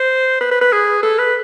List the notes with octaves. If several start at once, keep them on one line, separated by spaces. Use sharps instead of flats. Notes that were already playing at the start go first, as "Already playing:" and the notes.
Already playing: C5
B4
B4
B4
G#4
A4
B4